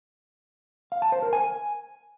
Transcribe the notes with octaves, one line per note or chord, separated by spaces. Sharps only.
F5
A5
C5
A#4
G#5